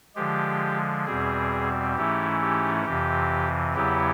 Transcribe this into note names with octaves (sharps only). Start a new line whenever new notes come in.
D3 F3 G#3 G4
E2 B2 G3 C4 G#4
G#2 E3 A3 C#4 E4 G4
G4
F2 C3 E3 G4
E2 C#3 F#3 B3 E4 G4